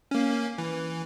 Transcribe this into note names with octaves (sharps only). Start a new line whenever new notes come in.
A#3 C#4
E3